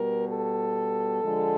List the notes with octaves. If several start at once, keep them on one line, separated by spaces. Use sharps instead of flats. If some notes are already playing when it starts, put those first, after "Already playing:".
Already playing: B2 G3 A#4
A4
D3 F3 G#3